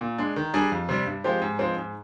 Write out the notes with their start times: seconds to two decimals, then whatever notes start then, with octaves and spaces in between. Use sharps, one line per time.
0.01 A#2
0.18 G#3 D4
0.36 D#3
0.54 G3 D4 G#4
0.72 F2
0.89 C3 G3
1.06 G2
1.24 F3 G#3 C4 G4
1.42 G#2
1.59 F3 G#3 C4
1.77 G#2